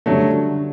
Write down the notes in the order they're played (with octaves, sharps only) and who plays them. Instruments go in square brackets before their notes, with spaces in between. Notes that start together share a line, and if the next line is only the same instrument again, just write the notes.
[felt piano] D3 G3 D4 F#4 [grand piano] F#3 A3